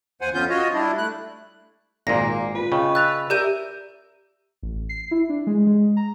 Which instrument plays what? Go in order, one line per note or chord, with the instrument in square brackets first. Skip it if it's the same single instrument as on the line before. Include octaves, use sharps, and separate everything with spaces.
[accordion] D#2 C5 F#5 G#5
F2 B3 C#4 F4 G6
F4 F#4 C#5 D#5
G3 D4 E4
A3 F#6
[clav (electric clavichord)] G#1 A#2 [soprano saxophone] A#3 [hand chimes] D5 [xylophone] A#6
[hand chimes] F4 [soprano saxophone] B4
[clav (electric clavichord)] C#3 [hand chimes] D#5 G5 C#6
[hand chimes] E6 [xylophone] F#6 A6 F7
[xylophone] G4 G6 D#7 [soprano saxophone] A#4 [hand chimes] D5 E5 E6
[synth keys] A1
C7
E4
D4
G#3
G#3
A#5